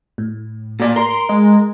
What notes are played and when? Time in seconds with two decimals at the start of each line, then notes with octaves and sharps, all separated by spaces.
0.18 A2
0.80 A#2 D5
0.96 A#4 C6
1.29 G#3